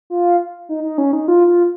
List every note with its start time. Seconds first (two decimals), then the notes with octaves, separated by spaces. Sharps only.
0.10 F4
0.69 D#4
0.84 D#4
0.98 C#4
1.13 D#4
1.28 F4
1.47 F4